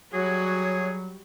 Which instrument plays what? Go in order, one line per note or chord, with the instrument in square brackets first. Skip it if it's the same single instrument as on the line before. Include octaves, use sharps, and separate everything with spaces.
[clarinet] F#3 [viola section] G3 F#4 [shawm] G#4 [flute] C#5